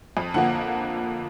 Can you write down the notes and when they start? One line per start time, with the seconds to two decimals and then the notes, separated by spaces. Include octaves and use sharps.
0.17 F2
0.34 D3 F3 A#3 F#5